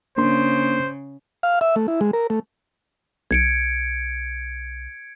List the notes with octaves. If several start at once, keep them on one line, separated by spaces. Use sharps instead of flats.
C#3 A#3 D4 C5 C6
F5
E5
A3
E4
G#3
A#4
A3
B1 G#6 C#7 D7